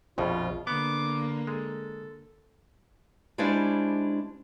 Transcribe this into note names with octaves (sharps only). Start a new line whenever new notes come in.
A#1 F2 B2 F4
D3 A#3 B3 D6
G#3 A4
G3 G#3 C#4 D4 E4 C5